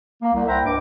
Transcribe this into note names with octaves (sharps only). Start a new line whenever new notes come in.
A#3
C2
E4 C5 E5 F#5 G5 A#5
C#2 G2 D6